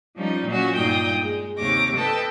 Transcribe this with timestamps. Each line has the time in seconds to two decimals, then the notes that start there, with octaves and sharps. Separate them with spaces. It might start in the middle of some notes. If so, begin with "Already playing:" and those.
0.14 F3 G3 C#4 D#4
0.45 A#2 F#3 C#4 F#4
0.75 G2 A#2 D#4 G5 D#6
1.21 G#3
1.57 D#2 C3 C#5 D6 A#6
1.95 A4 B4 D#5 G5 A5